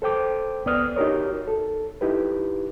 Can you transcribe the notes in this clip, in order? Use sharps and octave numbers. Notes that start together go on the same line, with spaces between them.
A4 C5 G5 D6
C#2 B3 B4 D5 D#6 F6
D#4 F#4 G4 A#4 C#5
A4
D#4 E4 G4 B4